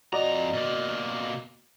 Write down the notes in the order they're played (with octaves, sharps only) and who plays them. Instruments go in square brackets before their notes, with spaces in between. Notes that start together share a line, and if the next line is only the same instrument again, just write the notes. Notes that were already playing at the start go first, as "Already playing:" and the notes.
[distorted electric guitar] F2 A#5 [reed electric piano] F#4 D5 D#5
[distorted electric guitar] B2 A#3